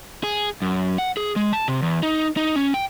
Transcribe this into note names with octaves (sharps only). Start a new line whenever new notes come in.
G#4
F#2
F#5
G#4
G#3
A5
C3
E2
D#4
D#4
C#4
G5